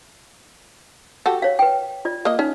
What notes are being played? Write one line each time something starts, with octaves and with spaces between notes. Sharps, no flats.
F#4 G4 A4
C#5 F5
B4 G5
F4 D5
A#3 D#5
C#4 D#4